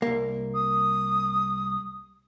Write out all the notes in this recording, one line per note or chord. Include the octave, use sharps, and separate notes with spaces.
C2 A#3
D#6